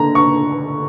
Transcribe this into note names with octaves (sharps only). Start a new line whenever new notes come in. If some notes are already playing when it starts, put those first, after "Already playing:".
Already playing: D3 A#5
C#6